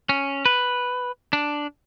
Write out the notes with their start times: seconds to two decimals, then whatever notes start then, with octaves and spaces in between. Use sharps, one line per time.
0.09 C#4
0.46 B4
1.33 D4